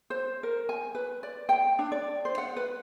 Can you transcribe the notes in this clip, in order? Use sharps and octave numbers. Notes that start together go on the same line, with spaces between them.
C5
A#4
G#5
B4
D5
G5
D4
D5
C5
F#5
B4